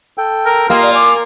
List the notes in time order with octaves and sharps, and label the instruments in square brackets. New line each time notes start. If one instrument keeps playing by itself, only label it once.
[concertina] A4 G5
[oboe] A#4
[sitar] A#3 [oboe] F4 [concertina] G4 D#5 F5
[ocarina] D5
[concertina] G#5 [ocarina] D6